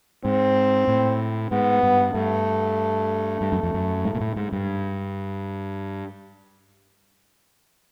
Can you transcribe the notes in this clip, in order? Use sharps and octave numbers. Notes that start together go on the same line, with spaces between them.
G#2 C4
A2
G#2 B3
G2
G2 A3
G2
F#2
F2
F#2
G#2
A#2
A2
G#2
G2